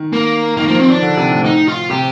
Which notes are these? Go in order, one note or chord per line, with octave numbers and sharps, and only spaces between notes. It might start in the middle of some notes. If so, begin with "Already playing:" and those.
Already playing: D#3
A#3
D#3 A#3
F3 A#3
D#3 C4
D4
D3
C3
A2
D#4
F4
C3 G4